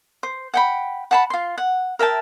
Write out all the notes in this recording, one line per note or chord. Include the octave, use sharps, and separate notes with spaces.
C5
F#5 G5 B5
F#5 A5 B5
F4 C6
F#5
A#4 E5 G5 A5